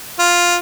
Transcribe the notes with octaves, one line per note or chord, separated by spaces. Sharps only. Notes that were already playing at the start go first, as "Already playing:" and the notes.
F4